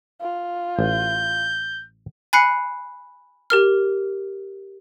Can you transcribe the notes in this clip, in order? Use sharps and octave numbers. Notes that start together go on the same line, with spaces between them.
F4
A1 G6
G#5 B5 F#6 C7 C#7
G4 A#4 F6